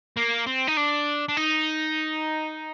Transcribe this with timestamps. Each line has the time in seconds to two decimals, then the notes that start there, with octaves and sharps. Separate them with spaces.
0.17 A#3
0.46 C4
0.67 D#4
0.77 D4
1.28 D4
1.37 D#4